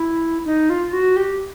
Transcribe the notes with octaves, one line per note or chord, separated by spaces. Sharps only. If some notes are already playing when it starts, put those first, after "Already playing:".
Already playing: E4
D#4
F4
F#4
G4